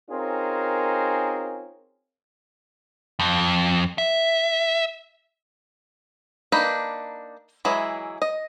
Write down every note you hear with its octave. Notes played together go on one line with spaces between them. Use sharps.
C4 C#4 D#4 F4 G#4 A#4
F2
E5
A#3 D4 D#4 B4
E3 F#3 G#3 E4 G#4
D#5